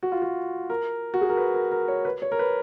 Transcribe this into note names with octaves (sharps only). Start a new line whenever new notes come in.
F#4
F4
F#4
A#4
F#4
G#4
A#4
B4
A#4
A#4
C#5
B4
C#5
A#4
B4